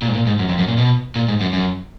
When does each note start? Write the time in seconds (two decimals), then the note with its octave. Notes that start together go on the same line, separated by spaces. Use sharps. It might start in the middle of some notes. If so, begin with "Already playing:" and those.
0.02 A#2
0.08 G#2
0.14 A#2
0.27 G#2
0.39 F#2
0.49 F2
0.59 F#2
0.68 A#2
0.78 B2
1.16 A#2
1.29 G#2
1.41 F#2
1.53 F#2